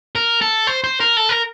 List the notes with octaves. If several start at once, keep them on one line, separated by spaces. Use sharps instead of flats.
A#4
A4
C5
C5
A#4
A4
A#4